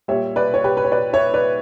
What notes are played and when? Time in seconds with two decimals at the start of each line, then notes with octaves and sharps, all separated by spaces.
0.08 A#2 G3 C#5 E5
0.36 B4 D5
0.54 C#5
0.64 G4 B4
0.77 B4
0.84 C#5
0.92 B4 D5
1.13 C#5 E5
1.34 B4 D5